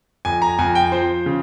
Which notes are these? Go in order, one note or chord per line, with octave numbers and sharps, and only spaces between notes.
F2 G#5
A#5
F2 G#5
G5
F3 C5
C#3